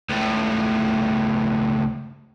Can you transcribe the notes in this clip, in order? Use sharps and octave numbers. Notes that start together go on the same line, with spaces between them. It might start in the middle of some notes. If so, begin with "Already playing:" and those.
C#2 A2